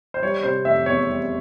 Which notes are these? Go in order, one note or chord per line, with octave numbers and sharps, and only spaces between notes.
C5
G3 C#5
C3 C5
F1 E5
E2 C#5
G3